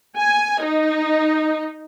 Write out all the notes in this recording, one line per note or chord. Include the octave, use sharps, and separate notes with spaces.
G#5
D#4